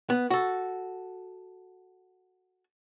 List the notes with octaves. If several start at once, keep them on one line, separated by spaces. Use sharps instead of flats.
B3
F#4 A4